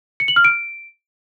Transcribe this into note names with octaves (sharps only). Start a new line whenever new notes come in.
C#7
F#7
F6
D7